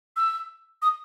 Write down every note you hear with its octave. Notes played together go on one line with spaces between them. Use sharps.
E6
D#6